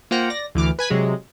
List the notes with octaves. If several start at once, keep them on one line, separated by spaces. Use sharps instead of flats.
A#3 F4 C5 F#5 G5 A#5
D5 A#6
D2 E3 D6 F6
B4 G#5 G#6 B6
C3 F#3 G#3